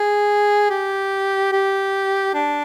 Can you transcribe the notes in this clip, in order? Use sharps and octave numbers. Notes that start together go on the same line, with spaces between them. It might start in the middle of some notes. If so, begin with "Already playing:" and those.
Already playing: G#4
G4
G4
D4